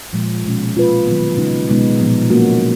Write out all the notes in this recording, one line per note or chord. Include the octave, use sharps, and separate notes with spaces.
A#2 F3 G#3
B2 G#3 C#4
A#3 F4 B4
D#3 F#3 B3
C#3 G#3 D#4
B2 G#3 B3 D#4
A#2 F3 B3
F#3 A#3 C#4 F#4